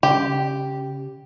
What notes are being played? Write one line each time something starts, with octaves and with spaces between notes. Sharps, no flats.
C#3 G4